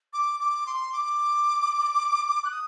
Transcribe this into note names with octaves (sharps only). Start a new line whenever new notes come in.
D6
D6
C6
D6
F#6
D#6